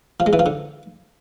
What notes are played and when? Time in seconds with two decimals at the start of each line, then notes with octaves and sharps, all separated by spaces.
0.20 F3
0.26 G#3
0.33 E3
0.39 F3
0.46 D3